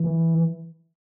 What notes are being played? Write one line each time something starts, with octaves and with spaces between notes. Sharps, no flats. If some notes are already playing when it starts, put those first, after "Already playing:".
Already playing: E3